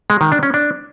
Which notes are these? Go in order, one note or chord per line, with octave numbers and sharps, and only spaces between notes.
G#3
D#3
D4
C#4
D4